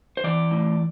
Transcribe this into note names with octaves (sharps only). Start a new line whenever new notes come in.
C5
E3 D5
A2